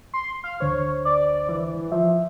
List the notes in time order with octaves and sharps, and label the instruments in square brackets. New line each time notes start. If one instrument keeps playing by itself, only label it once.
[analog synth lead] C6
F5
[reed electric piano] D2 D3 C5 [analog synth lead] C#5
[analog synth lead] D5
E3
[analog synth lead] F3 [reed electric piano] E5